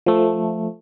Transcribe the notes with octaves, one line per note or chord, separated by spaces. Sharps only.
F3 A3